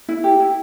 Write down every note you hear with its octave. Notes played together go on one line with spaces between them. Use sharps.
E4
G4
E4